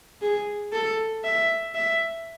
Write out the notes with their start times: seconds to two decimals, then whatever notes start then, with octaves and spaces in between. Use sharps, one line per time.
0.22 G#4
0.73 A4
1.24 E5
1.75 E5